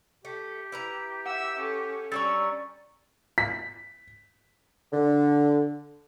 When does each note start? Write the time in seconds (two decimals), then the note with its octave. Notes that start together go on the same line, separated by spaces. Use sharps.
0.25 A3 G4
0.72 E4 B4 A#5
1.26 E5 F#5 E6
1.58 C#4 A4
2.12 G3 C#4 D4 A#5 C#6 E6 A6
3.38 B6
4.92 D3